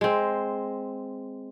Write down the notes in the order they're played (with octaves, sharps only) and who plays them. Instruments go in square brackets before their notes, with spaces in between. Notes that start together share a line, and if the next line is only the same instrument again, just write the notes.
[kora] G#3 C4